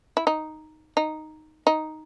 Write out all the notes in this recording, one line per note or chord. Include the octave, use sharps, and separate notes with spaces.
E4
D#4
D#4
D#4